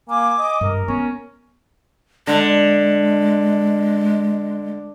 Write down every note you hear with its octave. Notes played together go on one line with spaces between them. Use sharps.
A#3 G#5 D6
D#5
G2 A#4
B3 C#4
D3 G#3